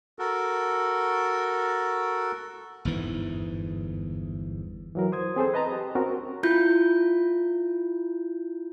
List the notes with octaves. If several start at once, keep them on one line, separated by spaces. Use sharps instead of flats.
F#4 A4 A#4
G1 E2 G#2 E3
E3 F#3 A#4
C5 D#6 G#6
C4 G#4 A4 C5
B4 D#5 A5 A#5
G4
C4 C#4 F#4 A#4
E4 F4 G6